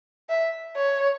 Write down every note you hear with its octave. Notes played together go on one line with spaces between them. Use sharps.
E5
C#5